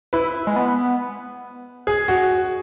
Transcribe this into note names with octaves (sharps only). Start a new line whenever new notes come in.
E4 B4
G#3
B3
G#4
F#4